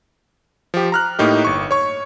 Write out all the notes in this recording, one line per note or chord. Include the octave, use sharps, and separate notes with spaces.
F3 G4
A#5 F6 F#6
A2 A#3 D#4 G4
G1 C#6
C#5 C#6